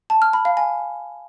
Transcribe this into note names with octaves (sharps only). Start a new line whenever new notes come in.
A5
F6
B5
F5
G#5